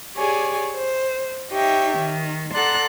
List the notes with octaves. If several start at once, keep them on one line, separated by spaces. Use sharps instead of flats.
G4 G#4 C#5 D5 G#5
C5
D#4 G4 C#5 E5 G5
D#3
A4 D5 F#5 A#5 C6 F#6